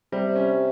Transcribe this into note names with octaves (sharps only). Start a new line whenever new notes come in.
C3 G3
C#4